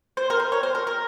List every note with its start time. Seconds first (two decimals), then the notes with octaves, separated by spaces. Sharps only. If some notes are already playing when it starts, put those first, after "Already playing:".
0.17 C5
0.30 A#4
0.40 C5
0.52 C#5
0.63 C5
0.75 A#4
0.87 A#4